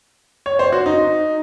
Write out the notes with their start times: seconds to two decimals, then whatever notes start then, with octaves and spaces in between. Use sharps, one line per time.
0.46 C#5
0.59 C5
0.72 F#4
0.86 D#4